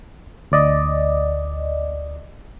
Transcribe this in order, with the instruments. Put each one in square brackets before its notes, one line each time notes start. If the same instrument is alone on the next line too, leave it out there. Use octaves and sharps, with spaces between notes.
[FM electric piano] D2 D5 D#5